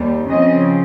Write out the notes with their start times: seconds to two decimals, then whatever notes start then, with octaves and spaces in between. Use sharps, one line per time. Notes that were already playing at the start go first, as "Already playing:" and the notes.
Already playing: D#2 G3
0.29 C#3 F3 C4 D#5